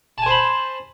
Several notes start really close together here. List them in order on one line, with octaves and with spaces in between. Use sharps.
A5 G#5 C5 B5